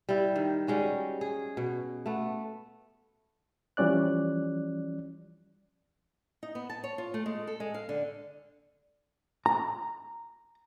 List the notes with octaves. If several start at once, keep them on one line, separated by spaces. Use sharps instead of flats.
G3 E4
D#3
G3 G#3 C#4 F#4
G#4
B2
A3 B3
E3 F3 G3 C#4 D5 F#6
D#4
B3
A5
C#5
F4
A3
G#3
A4
G#3
F5
D3
A#5